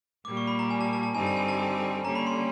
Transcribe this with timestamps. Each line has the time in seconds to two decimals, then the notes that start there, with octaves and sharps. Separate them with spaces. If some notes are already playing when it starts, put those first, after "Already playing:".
0.25 A#2 G3 A#3 D6
0.37 C#6
0.47 B5
0.59 A#5
0.71 G#5
0.81 A5
0.93 A5
1.03 A5
1.15 G2 D3 G3 C4 D#4 G#5
1.26 A5
1.36 G#5
1.48 A5
1.59 G#5
2.04 D3 G3 A#3 C#4 A#5
2.15 B5
2.27 C6